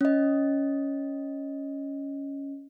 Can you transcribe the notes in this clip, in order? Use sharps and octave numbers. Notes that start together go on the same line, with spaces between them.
C#4 D#5